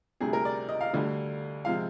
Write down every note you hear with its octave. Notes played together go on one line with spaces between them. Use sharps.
D2 C3 G3 G#4
A#4
D5
D#5
F5
D2 D3 G3
C3 F3 G#3 F5